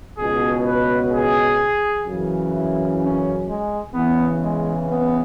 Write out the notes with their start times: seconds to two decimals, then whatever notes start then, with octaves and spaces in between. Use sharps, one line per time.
0.18 C#2 B2 G#4
0.65 B4
1.12 G#4
2.06 F#2 C#3 E3
2.53 E4
3.00 C#4
3.47 G#3
3.94 E2 C#3 E3 B3
4.40 G#3
4.87 B3